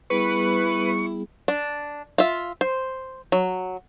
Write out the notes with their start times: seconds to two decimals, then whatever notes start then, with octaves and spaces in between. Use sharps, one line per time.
0.10 G3 B3 E4 G#4 B4 C#6
1.48 D4
2.18 F4 E5
2.61 C5
3.32 F#3